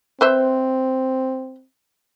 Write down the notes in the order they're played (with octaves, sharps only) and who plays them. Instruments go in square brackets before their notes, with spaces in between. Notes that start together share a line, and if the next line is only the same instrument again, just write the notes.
[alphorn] C4 [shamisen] B4 C5 E5